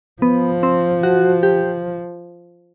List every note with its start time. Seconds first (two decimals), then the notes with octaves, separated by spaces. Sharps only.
0.22 F3 B3
0.63 C4
1.03 F#4
1.43 G4